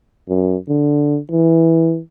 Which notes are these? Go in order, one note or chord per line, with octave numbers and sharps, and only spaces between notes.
F#2
D3
E3